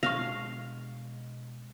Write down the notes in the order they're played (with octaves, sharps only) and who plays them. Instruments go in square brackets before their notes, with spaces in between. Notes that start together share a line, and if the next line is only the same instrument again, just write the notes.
[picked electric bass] B2 G#3 D4 [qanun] F5 [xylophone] C#6 F6 A#6